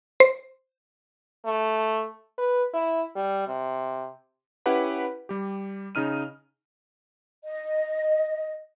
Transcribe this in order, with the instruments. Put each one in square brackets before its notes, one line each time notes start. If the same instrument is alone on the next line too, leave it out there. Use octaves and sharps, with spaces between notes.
[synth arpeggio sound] C5
[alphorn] A3
B4
E4
G3
C3
[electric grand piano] C#4 E4 G4 B4 F#5 B5
G3 G4
C#3 D#4 F6 D#7
[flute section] D#5